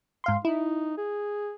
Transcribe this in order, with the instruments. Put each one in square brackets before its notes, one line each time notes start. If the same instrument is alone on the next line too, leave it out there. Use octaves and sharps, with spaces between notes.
[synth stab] G#2 F5 C6
[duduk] D#4 [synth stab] E4
[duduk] G#4